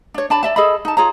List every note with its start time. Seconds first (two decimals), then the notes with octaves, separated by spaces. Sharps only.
0.14 D4 C#5
0.30 D4 A5 B5
0.43 D5 E5 A5
0.56 G#4 A4 D#5 B5
0.85 D#4 A5
0.97 F4 G#4 C#5 A#5